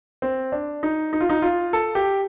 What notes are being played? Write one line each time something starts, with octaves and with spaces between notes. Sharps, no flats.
C4
D4
D#4
D#4
F4
D#4
F4
A4
G4